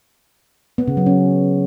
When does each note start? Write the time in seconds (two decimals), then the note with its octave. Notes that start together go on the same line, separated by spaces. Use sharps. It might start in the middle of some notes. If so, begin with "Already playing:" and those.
0.78 B3
0.88 C#3
0.97 F#3
1.06 C#4